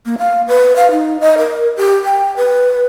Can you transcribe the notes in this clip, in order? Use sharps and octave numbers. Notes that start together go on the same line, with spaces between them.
A#3
F5
B4
F5
D#4
D#5
A#4
G4
G5
B4